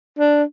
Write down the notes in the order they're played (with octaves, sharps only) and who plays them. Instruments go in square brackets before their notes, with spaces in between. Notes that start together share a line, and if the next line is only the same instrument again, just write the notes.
[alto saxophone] D4